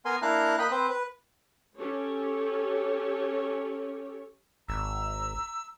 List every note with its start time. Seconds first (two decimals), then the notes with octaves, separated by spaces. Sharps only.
0.05 B3 A#4 G#5 C6
0.22 A#3 D4 E4 F5 A#5 F#6
0.59 A#3 D#5 G5 B5 F#6
0.71 C4 B4 C5
0.90 B4
1.77 C#4 G4 A4 C#5
4.68 G#1 A#5 E6